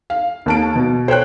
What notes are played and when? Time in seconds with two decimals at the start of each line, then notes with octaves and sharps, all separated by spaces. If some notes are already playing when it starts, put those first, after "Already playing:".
0.10 F5
0.46 D#2 A5 D7
0.76 B2
1.08 C5 C#5 G5 F#6